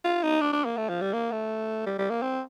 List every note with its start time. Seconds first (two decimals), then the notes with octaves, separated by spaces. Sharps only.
0.04 F4
0.23 D#4
0.41 D4
0.53 D4
0.65 A#3
0.77 A3
0.89 F3
1.01 G3
1.13 A#3
1.32 A3
1.86 G3
1.98 G3
2.10 A#3
2.22 C4